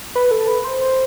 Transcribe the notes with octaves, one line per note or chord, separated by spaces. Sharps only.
B4
A4
B4
C5